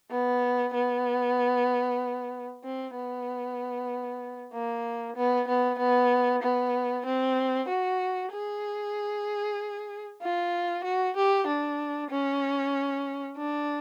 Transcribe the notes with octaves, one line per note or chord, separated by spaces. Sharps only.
B3
B3
C4
B3
A#3
B3
B3
B3
B3
C4
F#4
G#4
F4
F#4
G4
D4
C#4
D4